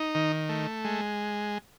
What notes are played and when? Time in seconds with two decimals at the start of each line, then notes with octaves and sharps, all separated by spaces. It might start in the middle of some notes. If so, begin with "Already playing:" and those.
Already playing: D#4
0.15 D#3
0.49 A3
0.85 G#3